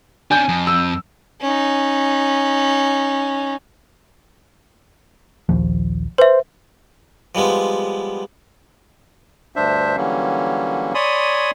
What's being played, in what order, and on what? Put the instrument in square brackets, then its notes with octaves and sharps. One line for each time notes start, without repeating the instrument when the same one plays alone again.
[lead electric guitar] C#4 D4 [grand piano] G#5 G6
[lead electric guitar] F2
[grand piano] E6
[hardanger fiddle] C#4 D#4
[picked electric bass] A#1 D#2 F3
[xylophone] B4 E5 [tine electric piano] C5
[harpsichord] F3 G3 G#3 B3
[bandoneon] D2 G2 D4 C5 E5
D3 E3 F#3 G3 A#3 C#4
C#5 D5 G#5 B5 C6 D#6